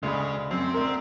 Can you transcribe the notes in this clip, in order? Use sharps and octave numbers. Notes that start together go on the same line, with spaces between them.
D2 C#3 G#3 B5
F#2 C4
D2 A#4